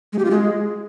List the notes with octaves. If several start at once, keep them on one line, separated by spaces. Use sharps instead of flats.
G#3
G4
F4
G#3